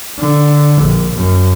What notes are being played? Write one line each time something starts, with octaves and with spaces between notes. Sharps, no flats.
D3
A#1
F#2